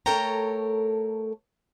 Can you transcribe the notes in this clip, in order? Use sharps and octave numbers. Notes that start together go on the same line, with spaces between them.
A3 A4 A#4 C#5 G5 A#5